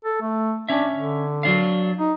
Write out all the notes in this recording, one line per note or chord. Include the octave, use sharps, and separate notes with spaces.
A4
A3
C#4 D4 E5
D3
F#3 D4 F5
D#4